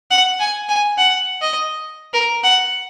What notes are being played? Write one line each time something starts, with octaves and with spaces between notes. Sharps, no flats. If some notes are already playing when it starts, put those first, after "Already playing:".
F#5
G#5
G#5
F#5
D#5
A#4
F#5